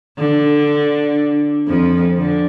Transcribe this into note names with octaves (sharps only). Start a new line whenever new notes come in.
D3
F2 F3
D3